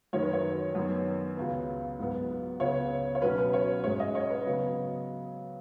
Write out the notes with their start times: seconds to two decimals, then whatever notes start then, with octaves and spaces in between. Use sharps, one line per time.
0.13 F#2 D#3 F#3 C#5
0.23 B4
0.33 C#5
0.75 F#2 D#3 F#3 B3
1.37 C#2 C#3 B3
1.99 G#2 F#3 B3
2.60 C#2 C#3 B3 C#5
3.15 C#5
3.22 B2 F#3 C#4 B4
3.38 B4
3.53 C#5
3.84 G#2 G#3 C#4 C#5
4.00 D#5
4.15 C#5
4.30 B4
4.46 C#3 F#3 B3